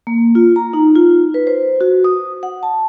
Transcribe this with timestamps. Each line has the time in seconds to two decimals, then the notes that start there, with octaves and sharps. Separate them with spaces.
0.07 A#3
0.35 F4
0.56 A#5
0.73 D#4
0.95 F4
1.34 B4
1.47 C5
1.81 F#4
2.04 D#6
2.43 F#5
2.63 A5